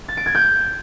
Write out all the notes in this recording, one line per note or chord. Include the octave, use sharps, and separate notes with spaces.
A6
D7
G#6
G6